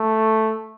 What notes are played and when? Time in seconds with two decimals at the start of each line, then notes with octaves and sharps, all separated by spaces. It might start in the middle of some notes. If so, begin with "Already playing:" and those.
Already playing: A3